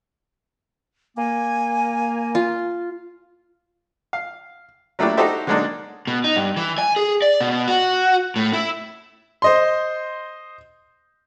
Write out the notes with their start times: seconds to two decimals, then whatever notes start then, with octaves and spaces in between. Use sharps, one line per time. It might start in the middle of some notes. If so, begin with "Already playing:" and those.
1.17 A#3 G#5
2.35 F4
4.13 F5
4.99 F#3 A3 A#3 D4 E4 G4
5.17 D#4 F#4 G4 A4 C5 E5
5.47 D3 F#3 G#3 A#3 D4 D#4
6.07 B2
6.24 D#4
6.36 G2
6.57 E3
6.78 G#5
6.96 G#4
7.22 D5
7.41 B2
7.68 F#4
8.36 A2
8.53 E4
9.42 C5 D#5 C6